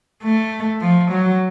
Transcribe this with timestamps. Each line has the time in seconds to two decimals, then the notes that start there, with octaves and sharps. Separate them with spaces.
0.24 A3
0.81 F3
1.11 F#3